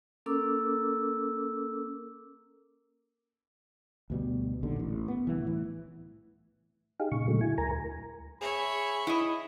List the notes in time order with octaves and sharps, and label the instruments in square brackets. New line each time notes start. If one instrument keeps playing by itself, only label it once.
[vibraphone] A#3 C#4 A4 A#4 D6 E6
[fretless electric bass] D2 B2 G3
A#1 D#2 D3
A1
B3
D1 C2 E3
A2 E3
[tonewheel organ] D#4 G4 G#4 F5
A#2 C#3 C#6
A#2 D3 F#3 G#3 A3
E4 G#5
D2 A#4 G#5 A#5
[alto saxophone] G#4 [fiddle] C#5 E5 [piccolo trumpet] B5
[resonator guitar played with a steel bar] E4 D#5